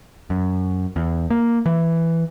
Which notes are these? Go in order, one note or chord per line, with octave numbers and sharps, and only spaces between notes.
F#2
E2
A#3
E3